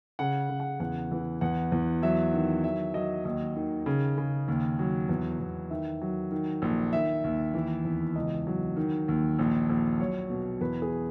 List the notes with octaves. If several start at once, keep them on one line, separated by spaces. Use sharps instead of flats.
C#3 F#5
C#3
F#5
E2 F#5
E3
E2 F#5
E2
F#3 E5
D#3
F#3 E5
F#3 D#5
D#2 D#5
D#3
C#3
C#3
D#2
F#3
E2
E2
D#3 E5
F#3
D#3
A#1
D#3 E5
D#2
E3
E2
C#2 D#5
F#3
D#3
D#2
A#1
A#1
F#3 C#5
B2
E2 B4
G#4